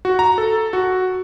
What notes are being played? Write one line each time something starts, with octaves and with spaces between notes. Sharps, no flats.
F#4
A#5
A4
F#4